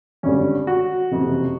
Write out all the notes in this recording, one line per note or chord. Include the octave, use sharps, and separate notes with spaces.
G#1 G2 D3 C#4
F#4
F#1 F2 C3 E3